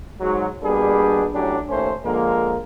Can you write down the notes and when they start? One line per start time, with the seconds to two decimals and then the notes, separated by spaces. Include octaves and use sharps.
0.20 G#2 F#3
0.62 B2 G3 A#3 D4 G#4
1.34 A2 F#3 C#4 D4 G4
1.69 D#2 A3 C#4 C5
2.04 D3 F3 G#3 A#3